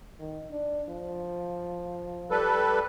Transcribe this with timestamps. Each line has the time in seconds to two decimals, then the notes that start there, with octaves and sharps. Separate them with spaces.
0.20 D#3
0.51 D4
0.89 F3
2.31 G3 A4 B4